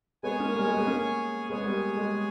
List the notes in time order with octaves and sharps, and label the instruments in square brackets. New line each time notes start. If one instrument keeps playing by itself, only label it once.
[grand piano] G#3 B3 [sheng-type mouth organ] G#4 C#5 G#5
[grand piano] A#3 C#4
G3 A#3
G#3
G#3 B3
A#3 C#4
[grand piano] G#3 B3 [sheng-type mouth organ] G#4 C#5 G#5
[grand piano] B3
G3 A#3
G#3